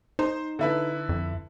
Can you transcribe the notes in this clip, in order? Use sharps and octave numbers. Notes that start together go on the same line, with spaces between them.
D#4 C5
D3 E4 B4
F2